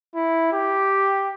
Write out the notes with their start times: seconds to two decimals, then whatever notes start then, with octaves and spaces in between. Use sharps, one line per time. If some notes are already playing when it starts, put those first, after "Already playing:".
0.15 E4
0.53 G4